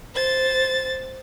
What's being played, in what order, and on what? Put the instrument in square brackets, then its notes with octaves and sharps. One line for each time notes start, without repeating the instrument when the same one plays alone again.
[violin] C5 A6